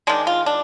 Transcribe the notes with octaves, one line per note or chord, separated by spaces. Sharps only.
D#3 G#3 D4
F4
D4